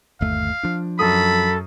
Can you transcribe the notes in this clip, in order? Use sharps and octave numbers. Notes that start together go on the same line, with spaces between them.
G1 D#2 A3 F5
F3 D4
F#2 A4 B5 D#6